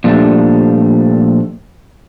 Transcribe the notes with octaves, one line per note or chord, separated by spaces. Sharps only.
A#2 F3 G3 A3 D4